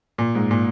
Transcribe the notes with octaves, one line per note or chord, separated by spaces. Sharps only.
A#2
G#2
A#2